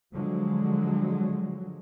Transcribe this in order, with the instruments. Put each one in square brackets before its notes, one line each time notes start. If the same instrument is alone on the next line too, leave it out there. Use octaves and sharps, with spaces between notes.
[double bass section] D3 F3 F#3 G#3